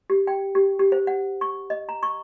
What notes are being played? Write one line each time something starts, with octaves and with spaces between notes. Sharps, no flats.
G4
G5
G4
G4
C5
F#5
C#6
D#5
A#5
C#6